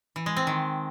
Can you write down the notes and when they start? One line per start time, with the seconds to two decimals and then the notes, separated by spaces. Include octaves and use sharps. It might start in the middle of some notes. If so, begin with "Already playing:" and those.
0.16 E3
0.26 G#3
0.37 C4
0.47 D#3